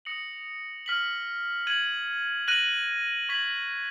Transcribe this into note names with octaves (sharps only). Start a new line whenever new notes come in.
D#6 A#6 C#7 F#7
F6 B6 F#7
G#6 D#7 F#7
F#6 A#6 D#7 F#7
C#6 G#6 B6 F#7